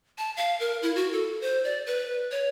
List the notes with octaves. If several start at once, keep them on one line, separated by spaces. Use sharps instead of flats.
A5
F5
A#4
E4
F#4
A4
C5
D5
B4
C#5